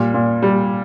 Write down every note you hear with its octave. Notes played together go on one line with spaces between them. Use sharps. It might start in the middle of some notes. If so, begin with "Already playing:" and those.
Already playing: A#2 G3
A#2
G3